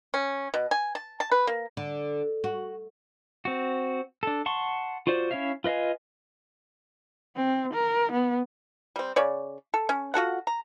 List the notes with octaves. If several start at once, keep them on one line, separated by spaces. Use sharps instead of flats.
C#4
B2
G#5
A5
A5
B4
A#3
D3
F#4
C4 F#4
D4 A4
F#5 A5 C6 C#6
F4 F#4 C5 D5
C#4 E4 C#5 E5 F5
F4 B4 D#5 F5 G#5
C4
A#4
B3
G3 C4
C#3 C#5 D5
A4
C#4
F4 F#4 A4 F#5
A#5